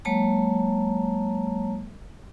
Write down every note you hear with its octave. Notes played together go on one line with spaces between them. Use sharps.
F#3 G#3 A#3 C#5 A5 A#5